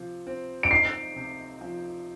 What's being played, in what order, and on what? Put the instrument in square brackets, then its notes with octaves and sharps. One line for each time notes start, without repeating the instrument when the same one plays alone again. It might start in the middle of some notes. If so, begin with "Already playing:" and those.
Already playing: [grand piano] C3 F3
C4
[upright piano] D7
[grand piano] D#4 [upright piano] C7
[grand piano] C3
F3